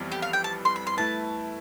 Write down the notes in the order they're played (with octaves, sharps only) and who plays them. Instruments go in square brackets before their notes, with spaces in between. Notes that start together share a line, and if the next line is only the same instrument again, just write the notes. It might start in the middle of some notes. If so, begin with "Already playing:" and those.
Already playing: [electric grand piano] F2 E3 G3 B3
[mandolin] G4
F5
G5
A5
C6
B5
C6
[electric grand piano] A3 E4 B4 [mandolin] A5